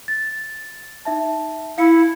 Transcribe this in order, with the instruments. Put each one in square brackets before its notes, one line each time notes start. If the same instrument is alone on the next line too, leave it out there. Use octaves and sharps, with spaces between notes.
[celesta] A6
D#4 E5 A5
[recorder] E4 [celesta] F5 C#7